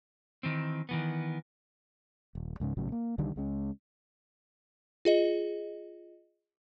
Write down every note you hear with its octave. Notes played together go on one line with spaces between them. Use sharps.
D#3 E3 C4
D#3 E3 B3
D#1
C#2 G#2 C#3
A#1 A2 C#3 F#3
A#3
C2 D3 D#3 G3
C#2 G#3 C#4
F4 G#4 D#5